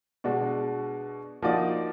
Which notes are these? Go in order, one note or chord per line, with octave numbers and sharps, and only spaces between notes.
B2 G#3 D4 F#4
F3 A#3 D#4 F#4 D5